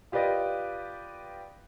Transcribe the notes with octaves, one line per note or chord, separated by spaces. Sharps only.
F4 G4 B4 D5 D#5